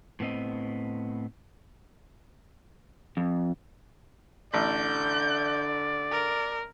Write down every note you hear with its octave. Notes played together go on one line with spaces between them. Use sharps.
A2 B3 C4 D#5
F2
A1 D3 D5 G6
A#4